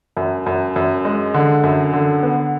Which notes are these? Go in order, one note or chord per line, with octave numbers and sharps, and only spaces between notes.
F#2
F#2
F#2
G#3
D3
F#2
D3
B3